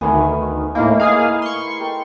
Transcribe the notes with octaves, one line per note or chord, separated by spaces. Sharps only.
D2 D#3 A3 B3 G#5
A2 A3 A#3 D#4 E4
A#3 G#4 F5
C6 C#6
A4 A#4 G5